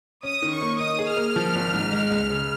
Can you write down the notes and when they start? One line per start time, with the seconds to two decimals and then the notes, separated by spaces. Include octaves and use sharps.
0.23 C#4 D#6
0.42 D#3
0.51 C#6
0.61 A#3
0.80 D#4 D#6
0.99 G#4
1.08 F6
1.17 A#3
1.36 F3
1.55 G#1
1.73 G#2
1.92 G#3
2.11 C#2
2.30 C#3